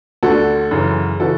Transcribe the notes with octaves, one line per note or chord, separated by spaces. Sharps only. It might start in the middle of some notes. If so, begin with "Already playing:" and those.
D2 D3 F#4 A4
F#2 C#3 E3
C#3 E3 F#4 A4